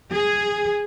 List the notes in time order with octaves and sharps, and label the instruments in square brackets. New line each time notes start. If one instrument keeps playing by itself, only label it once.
[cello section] G#4